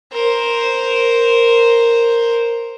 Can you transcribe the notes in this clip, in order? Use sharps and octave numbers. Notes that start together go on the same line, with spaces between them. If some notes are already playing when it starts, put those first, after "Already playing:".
A#4 C5